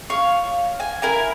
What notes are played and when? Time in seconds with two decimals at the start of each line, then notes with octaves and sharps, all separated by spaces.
0.10 C#5 F5
0.80 G#5
1.02 E4 A#4 G#5